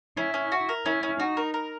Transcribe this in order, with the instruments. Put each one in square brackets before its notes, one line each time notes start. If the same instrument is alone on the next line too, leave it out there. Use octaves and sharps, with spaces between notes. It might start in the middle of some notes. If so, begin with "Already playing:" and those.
[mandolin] C#4 [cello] E4
[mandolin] C#4
F#4
A#4
[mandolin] C#4 [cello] E4
[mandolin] C#4
[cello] D#4 [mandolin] F#4
[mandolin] A#4
A#4